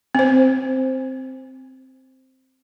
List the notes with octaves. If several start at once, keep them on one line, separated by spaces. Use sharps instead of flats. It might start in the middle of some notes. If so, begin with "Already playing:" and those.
C4 C5